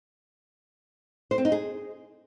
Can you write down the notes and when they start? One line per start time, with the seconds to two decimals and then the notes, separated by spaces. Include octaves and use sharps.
1.31 C5
1.38 C4
1.45 D#4
1.52 G#4